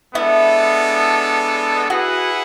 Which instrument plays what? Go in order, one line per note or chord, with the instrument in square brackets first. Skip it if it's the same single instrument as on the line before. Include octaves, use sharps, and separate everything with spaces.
[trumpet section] G#3 B3 D4 A4 [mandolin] E4
[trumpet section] E4 G#4 B4 F#5 [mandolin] F#4